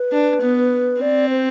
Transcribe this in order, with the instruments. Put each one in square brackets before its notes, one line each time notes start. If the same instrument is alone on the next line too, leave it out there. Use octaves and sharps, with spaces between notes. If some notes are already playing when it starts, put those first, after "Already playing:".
Already playing: [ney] B4
[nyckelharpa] D4
B3
[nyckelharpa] C4 [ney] D5
[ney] C5